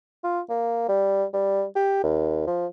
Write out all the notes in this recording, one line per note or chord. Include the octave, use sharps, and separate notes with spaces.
F4
A#3
G3
G3
G4
D#2
F3